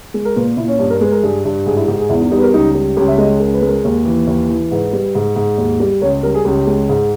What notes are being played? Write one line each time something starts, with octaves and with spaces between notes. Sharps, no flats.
G#3
A#4
A#2 B4
A#2 E4
C#4
G2 C#4
A#4
G#3 B4
A#4
G2 G#4
G2
G#2 G#4
E4
G#2 G4
G#4
E2 E4
D#4
G3 D#4
B4
A#4
C#2 D#4
G3
C#2 G4
E5
G#3 D#5
C#2 A#4
B4
G#3
A#4
D#2
E3
D#2
E3
G#2 B4
G3
G#2
G#2
D#2
G3
C#2 C#5
G3 A#4
G#4
C#2 G4
G#3
G#2